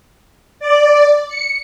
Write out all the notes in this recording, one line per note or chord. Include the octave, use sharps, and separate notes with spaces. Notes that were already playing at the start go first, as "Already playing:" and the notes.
D5
C#7